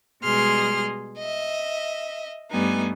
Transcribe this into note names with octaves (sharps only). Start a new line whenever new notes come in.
B2 G3 G#3 G#4 C6 F6
D#5 E5
G2 G3 A3 B3 D#4 G#5